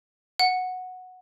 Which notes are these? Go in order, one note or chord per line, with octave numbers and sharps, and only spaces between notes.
F#5